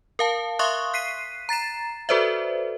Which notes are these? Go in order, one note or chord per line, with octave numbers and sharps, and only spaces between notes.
A#4 F5 A5
E5 F5 C6 C#6 D#6 F#6
F#6 B6 C7 D#7
A#5 A6 C7 E7
F#4 A4 B4 C5 D5 E5